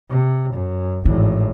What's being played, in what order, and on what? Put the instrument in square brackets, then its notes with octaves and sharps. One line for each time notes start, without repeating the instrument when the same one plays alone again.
[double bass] C3
F#2
[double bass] G#1 A2 [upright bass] E3